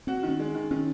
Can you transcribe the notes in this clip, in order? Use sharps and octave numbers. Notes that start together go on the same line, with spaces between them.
C4 F#4
D#3
C#4
G#3
D#3
D#3 C#4